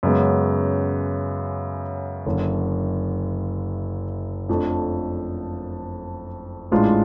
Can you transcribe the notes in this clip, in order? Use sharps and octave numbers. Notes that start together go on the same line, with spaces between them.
F#2 C#3 G#3 B3
F#1 F#2 D3
F2 F3 A3 D4
A1 G#2 G#3 D4 F4